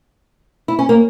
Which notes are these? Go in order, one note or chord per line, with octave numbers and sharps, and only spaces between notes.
E4
C#4
A#3